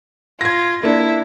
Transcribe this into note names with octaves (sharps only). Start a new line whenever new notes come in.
F4 G#6 A#6
A#3 D4 E4